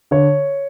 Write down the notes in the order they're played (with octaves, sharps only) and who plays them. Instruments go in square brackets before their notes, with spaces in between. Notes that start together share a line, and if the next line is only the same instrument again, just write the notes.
[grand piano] D3 C#5